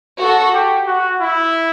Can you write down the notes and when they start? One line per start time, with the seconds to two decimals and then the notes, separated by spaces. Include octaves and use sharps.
0.20 F#4 A4
0.54 G4
0.87 F#4
1.20 E4